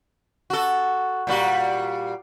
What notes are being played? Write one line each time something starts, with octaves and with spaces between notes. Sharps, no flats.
F#4 A4
A#2 G3 F#4